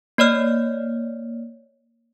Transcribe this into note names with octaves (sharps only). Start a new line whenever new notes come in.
A#3 C#5 D5 F6